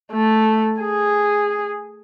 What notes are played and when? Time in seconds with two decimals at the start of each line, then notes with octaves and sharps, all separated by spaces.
0.12 A3
0.81 G#4